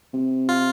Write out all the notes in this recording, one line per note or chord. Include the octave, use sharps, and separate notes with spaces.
C3
F4